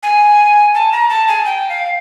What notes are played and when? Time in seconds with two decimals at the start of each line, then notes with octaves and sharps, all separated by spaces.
0.03 G#5
0.74 A5
0.92 A#5
1.09 A5
1.28 G#5
1.45 G5
1.69 F5